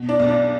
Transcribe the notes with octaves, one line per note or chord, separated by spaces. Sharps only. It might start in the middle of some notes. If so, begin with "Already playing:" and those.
Already playing: B2
D4 D5
B1
D4 D5